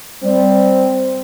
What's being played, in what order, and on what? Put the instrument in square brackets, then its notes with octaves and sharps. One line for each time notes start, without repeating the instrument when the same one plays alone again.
[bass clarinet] G3 [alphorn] C4